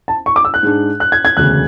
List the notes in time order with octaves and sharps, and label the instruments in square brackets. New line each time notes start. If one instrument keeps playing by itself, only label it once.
[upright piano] A5
C#6
D6
E6
F#6
[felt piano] G#2 G#3 D4
[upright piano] F#6
G#6
G#6
[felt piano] E1 D2 C#3 [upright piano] F#6